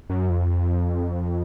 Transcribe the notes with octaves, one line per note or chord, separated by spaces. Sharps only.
F#2
F2